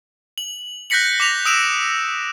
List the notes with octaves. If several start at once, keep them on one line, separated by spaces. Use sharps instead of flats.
F#7
F#6 G6 A#6 B6 C#7 F#7
D6 B6 F7
D#6 E6 D7 E7 F7